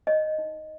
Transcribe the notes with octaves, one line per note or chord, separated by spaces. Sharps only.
C#5 D#5
D#4